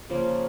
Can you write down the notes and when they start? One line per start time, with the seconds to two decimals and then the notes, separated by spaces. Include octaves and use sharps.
0.10 C#3 F3 A#3